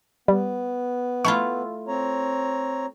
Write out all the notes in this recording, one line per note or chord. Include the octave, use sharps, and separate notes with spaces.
G3 B3
A3 E4 F4 C#6
C4 C#5 A#5